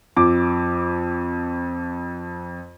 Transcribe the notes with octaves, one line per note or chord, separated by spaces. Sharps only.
F2 D6